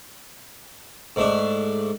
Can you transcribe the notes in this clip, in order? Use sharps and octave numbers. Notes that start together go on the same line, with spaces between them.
G#2 A3 D4